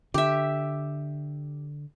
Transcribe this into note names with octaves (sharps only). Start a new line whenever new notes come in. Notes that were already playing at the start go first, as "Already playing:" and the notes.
D3 G4 E5